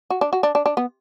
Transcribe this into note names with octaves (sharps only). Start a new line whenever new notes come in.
F#4
D4
F#4
D4
D4
D4
B3